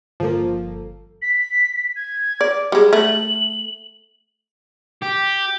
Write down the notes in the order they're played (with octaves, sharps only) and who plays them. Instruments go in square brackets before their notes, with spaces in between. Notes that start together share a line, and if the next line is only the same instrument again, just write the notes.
[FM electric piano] G1 A4 [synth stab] F3 A#3
[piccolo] B6
G#6
[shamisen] D5
[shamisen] G3 G#3 [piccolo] C6
[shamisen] A3 [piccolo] F#7
[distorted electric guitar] G4